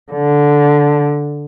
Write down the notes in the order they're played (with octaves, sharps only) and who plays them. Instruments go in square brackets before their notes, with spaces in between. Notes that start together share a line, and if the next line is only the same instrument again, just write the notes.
[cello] D3